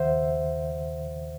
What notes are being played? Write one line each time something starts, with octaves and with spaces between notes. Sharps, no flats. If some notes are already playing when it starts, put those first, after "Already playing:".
Already playing: D#2 D#3 C5 E5 F#5